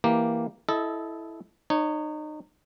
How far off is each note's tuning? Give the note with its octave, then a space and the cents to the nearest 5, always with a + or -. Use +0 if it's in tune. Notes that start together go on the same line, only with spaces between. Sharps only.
E3 +0 A#3 +0 G4 +0
E4 +0 A4 -15 D#5 +15
D#4 -30 C#5 +0